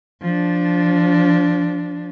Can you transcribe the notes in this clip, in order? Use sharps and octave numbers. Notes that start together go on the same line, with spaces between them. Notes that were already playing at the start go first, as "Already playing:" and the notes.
F3 D4